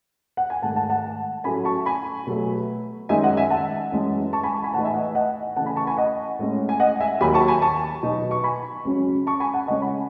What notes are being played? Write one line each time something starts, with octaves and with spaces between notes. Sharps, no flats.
F#5
G#5
G#2 D#3 A3 F#5 A5
F#5 A5
F#5 A5
A2 F#3 A3 C#4 G#5 B5
A5 C#6
G#5 B5
B2 F#3 A3
F#2 D#3 G#3 D#4 E5 G#5
D#5 F#5
E5 G#5
F#5 A5
F#2 E3 G#3
A5 C#6
G#5 B5
A5 C#6
G#5 B5
A2 E3 B3 D#4 F#5 A5
E5 G#5
D#5 F#5
D#5 F#5
C#3 E3 A3 F#5 A5
G#5 B5
A5 C#6
G#5 B5
D#5 F#5
A2 G#3 C#4
G#5
D#5 F#5
E5 G#5
D#2 D#3 F#3 G#5 B5
A5 C#6
G#5 B5
A5 C#6
B2 F#3 B3 D#4
C#6
G#5 B5
C#2 C#3 F#3 C#4
A5 C#6
G#5 B5
F#5 A5
C#3 G#3 C#4 D#5 F#5
G#5 B5